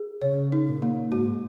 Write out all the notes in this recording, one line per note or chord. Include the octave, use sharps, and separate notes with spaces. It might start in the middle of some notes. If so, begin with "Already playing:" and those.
Already playing: G#4
C#3 C#5
D#4
A#2
A#3
G#2 F#4